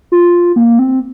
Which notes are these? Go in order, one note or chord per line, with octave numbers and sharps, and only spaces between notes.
F4
A#3
C4